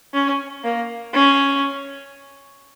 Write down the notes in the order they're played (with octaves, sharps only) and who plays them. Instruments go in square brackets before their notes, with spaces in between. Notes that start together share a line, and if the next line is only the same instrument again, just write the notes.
[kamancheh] C#4
A#3
C#4